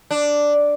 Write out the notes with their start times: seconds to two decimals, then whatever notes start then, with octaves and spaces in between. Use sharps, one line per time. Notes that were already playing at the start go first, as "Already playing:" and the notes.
0.11 D4